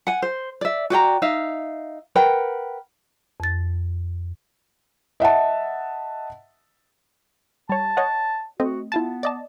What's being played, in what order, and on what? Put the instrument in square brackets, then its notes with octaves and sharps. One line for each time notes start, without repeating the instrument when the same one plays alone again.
[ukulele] F#5 G#5
C5
D5 E5
F#4 D5 G5 A#5
D#4 E5 F5
A#4 B4 F#5 G5
[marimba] F2 A6
[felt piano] D#5 E5 F#5 A5
[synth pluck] G3 C#5 [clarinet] A5
[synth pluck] C#5 D#5 F#5
[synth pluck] A3 C4 D#5 [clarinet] F#4
[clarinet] B3 [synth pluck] E4 F4 A5
[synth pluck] D5 D#5 A5